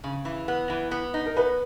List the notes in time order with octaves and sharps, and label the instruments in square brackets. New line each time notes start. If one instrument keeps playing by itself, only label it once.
[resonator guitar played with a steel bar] C#3
E3
B3
E3
B3
D#4
[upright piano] A#4
[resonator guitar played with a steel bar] B3 [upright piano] B4